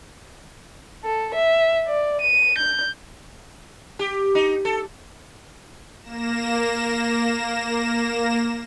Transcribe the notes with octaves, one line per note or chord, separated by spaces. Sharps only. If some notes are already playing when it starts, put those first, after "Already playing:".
A4
E5
D5
D#7
G6
G4
D#4
A4
A#3 A#6 E7